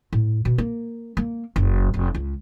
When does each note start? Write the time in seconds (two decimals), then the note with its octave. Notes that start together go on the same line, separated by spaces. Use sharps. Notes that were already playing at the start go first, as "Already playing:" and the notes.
0.13 A2
0.45 B2
0.58 A#3
1.17 A#3
1.56 F#1
1.94 F1
2.15 C#2